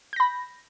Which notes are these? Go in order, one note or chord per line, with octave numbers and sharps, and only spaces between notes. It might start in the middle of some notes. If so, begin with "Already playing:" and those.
B5 G6 A#6